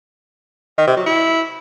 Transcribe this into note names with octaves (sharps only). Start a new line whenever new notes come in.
D#3
C3
F#3
E4